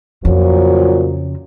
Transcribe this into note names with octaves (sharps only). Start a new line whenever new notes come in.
F2 A#2 C#3 F3 F#3